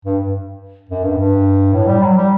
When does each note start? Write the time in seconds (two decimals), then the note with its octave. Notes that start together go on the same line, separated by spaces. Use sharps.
0.05 G2
0.90 F#2
1.04 G2
1.18 G2
1.73 A2
1.87 G3
2.02 F#3
2.17 G3